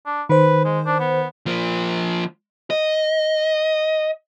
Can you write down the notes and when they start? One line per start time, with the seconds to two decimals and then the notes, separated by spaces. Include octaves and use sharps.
0.06 D4
0.29 D#3 B4 C5
0.65 G#3
0.86 D4
1.00 B3
1.46 F3 A#3
2.70 D#5